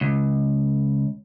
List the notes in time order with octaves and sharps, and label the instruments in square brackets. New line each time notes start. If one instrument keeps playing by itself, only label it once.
[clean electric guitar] C#2